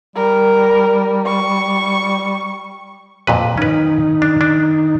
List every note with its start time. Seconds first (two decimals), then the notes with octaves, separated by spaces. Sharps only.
0.16 G3 A#4
1.26 C#6
3.27 F2 A#2 B4
3.58 D#3 C#4 D#4 B4
4.22 D4
4.41 D4